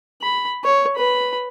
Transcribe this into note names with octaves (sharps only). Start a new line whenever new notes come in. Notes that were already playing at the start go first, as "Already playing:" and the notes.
B5
C#5
B4 B5